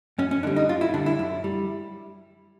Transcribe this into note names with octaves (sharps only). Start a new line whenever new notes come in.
F#2 C#4
C#4
D3 G3 D4
D#4
F#2 F4
E4
D3 G3 D4
E4
F#2
G3